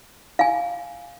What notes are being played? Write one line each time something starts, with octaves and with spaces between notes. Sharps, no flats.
F5 G#5